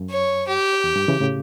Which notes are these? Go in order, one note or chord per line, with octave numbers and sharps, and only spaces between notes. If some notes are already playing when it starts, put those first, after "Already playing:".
Already playing: F#2
C#5
G4
E2
G2
C#3 E3
A2 C#3